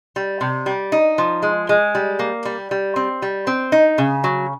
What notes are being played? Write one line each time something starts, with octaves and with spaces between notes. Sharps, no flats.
G3
C3
G3
D#4
F3
G#3
G#3
G3
A#3
G3
G3
C4
G3
C4
D#4
C#3
F#3